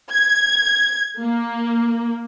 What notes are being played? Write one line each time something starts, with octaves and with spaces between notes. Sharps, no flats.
G#6
A#3